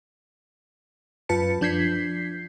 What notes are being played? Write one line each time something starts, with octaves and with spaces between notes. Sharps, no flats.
F#2 F4 B4 A5 C#7
F3 D4 G6 G#6 B6 C7